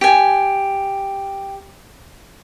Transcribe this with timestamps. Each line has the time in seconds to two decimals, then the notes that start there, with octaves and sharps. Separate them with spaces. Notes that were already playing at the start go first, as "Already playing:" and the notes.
0.01 G4 G#5